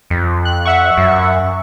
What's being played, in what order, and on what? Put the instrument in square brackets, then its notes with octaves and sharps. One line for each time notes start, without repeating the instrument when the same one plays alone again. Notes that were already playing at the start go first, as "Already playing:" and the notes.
[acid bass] F2
[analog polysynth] F#6
E5 F#5 C#6
[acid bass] F#2